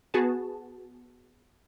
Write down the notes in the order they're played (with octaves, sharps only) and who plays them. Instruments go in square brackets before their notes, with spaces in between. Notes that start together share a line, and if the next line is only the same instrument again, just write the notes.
[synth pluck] B3 F#4 G#4 B4 A5